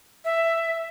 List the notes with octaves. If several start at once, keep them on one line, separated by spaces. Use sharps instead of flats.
E5